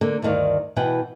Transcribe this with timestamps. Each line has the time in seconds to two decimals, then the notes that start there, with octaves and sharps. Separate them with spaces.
0.01 D3 A#3
0.22 D2 G2 D#3 D5 F5
0.76 B2 E3 E4 B4 F#5 G5